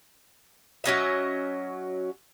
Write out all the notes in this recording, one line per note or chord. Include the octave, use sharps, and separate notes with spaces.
F#3 C#4 D#5 E5